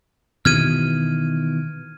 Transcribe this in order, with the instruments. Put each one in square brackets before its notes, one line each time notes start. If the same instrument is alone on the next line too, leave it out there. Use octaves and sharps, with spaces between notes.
[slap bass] B2 D#3 E3 [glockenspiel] F6 G#6 D#7